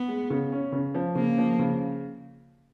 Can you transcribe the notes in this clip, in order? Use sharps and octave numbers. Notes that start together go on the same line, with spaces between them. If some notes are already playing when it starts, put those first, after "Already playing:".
Already playing: B3
G#3
C#3
C#4
C#3
F3
C#3 A#3
F3
C#3